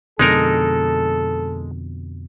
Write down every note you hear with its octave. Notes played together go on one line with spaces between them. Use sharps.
F2 B2 D3 G#3 D#4 A4 A#4